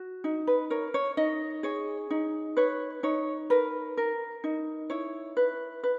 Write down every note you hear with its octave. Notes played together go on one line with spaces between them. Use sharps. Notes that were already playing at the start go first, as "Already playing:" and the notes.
Already playing: F#4
D#4
B4
A#4 C#5
C#5
D#4 D#5
G#4 C#5
D#4
B4 C#5
D#4 C#5
A#4 B4
A#4
D#4
E4 C#5
B4
B4